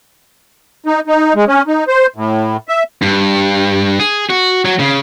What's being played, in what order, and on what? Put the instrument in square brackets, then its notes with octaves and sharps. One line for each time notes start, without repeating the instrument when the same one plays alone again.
[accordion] D#4
D#4
G#3
C#4
D#4
C5
A2
E5
[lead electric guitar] G2
G#4
F#4
F#3
C#3